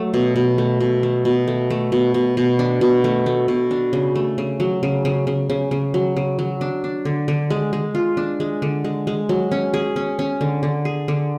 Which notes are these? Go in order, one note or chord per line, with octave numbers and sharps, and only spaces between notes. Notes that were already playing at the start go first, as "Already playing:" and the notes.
Already playing: F#3 A3
B2
B2
A3
B2
A3
B2
A3
A3
B2
B2
B2
D4
B2
A3
A3
B2
D4
C#3
A3
C#3
F#3
C#3
C#3
C#3
C#3
C#3
F#3
C#3
F#3
D4
D4
D3
D3
G#3
G#3
F4
D4
G#3
D3
G#3
G#3
F#3
C#4
G#4
C#4
C#4
D3
D3
G#4
D3